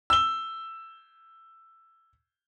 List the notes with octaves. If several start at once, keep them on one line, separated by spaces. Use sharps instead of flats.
E6 G7